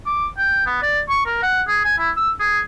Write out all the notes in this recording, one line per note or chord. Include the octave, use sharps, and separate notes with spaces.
D6
G5
B3
D5
C#6
A#4
F#5
G#4
G#5
E4
E6
G#4